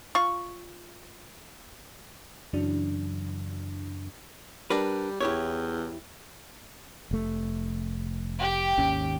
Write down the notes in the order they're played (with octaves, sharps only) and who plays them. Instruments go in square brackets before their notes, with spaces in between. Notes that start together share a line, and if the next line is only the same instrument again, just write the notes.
[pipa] F4 C#6
[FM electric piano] F#2 C#3 E3 F#3 D4
[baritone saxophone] G3 [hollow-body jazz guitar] D4 A#4 B4
[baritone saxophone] E2 [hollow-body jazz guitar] E4 G4 C#5
[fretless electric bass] F1 A3
[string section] G4
[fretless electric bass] G#1 D#2 C#4